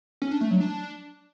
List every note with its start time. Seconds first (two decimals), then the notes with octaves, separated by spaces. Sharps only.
0.22 C#4
0.31 D4
0.41 A3
0.51 F#3
0.60 D4